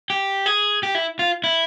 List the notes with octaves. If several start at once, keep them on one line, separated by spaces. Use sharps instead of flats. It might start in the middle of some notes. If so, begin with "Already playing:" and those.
G4
G#4
G4
E4
F4
E4